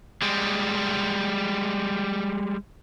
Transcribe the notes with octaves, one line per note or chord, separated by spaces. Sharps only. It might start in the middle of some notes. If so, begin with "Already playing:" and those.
G3 G#3